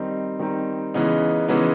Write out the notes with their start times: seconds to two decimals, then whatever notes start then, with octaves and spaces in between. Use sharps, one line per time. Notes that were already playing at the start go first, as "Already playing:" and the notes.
Already playing: D#3 G3 C4 D#4
0.39 D#3 G3 C4 D#4
0.94 C#3 E3 G#3 B3 D#4
1.48 C#3 E3 G#3 B3 D#4